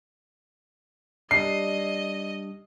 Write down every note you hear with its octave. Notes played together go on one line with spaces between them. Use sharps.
G3 D4 D#5 C7